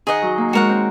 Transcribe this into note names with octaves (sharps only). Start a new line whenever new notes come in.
D#3 G#4 D#5 F#5
F#3
A#3
G#3 F#4 A#4 C#5 F#5
C4